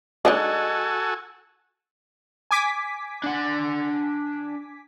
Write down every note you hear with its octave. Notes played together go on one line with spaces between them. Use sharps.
G#3 D4 D#4 F#4 A4 G#5
G#5 D6 B6
D4 F#5